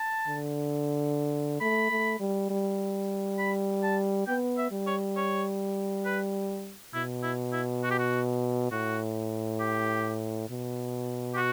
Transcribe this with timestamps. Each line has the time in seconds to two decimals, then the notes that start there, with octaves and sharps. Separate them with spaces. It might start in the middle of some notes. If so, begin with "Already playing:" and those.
Already playing: A5
0.28 D3
1.61 A3 B5
1.91 A3
2.20 G3
2.50 G3
3.38 B5
3.83 A5
4.27 B3 G5
4.58 E5
4.71 G3
4.87 C#5
5.16 C#5
6.05 B4
6.94 B2 E4
7.23 E4
7.53 E4
7.83 F#4
7.91 G4
7.99 F#4
8.71 A2 F#4
9.60 G4
10.49 B2
11.34 G4
11.37 F#4